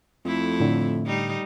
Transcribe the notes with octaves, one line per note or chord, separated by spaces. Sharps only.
F2 A3 E4
A2 D3
G3 D#4